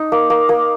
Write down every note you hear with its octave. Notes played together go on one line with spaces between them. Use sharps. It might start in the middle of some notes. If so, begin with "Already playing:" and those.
Already playing: D#4
A#3
A#3
A#3